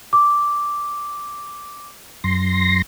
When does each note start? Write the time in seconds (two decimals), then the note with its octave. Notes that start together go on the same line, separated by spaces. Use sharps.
0.13 D6
2.24 F#2 C6 A#6